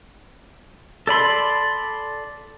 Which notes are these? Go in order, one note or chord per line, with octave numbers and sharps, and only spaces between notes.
A4 D5 B5 C6